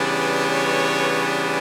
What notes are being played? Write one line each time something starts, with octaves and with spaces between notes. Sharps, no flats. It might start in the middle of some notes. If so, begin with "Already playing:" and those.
Already playing: C#3 E3 G3 B3 D4 D5
C#5